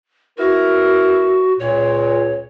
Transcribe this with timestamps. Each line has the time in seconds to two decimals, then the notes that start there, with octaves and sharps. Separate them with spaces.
0.39 B3 E4 F#4 A#4
1.59 C#2 A#2 C#5